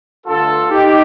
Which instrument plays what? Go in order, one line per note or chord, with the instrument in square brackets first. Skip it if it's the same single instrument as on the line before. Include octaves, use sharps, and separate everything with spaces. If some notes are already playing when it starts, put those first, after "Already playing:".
[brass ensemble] G2 D3 A3 F4 A4
D#4 G4